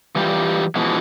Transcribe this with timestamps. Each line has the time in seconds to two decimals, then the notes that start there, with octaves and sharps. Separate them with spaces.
0.16 E3 G3 F4 G4
0.75 B2 E3 F3 G#3